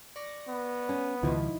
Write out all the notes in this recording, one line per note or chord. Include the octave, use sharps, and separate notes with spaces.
D5 C#6 A#6
B3
C#4
C#2 B2 D#3 F3 D#4 E4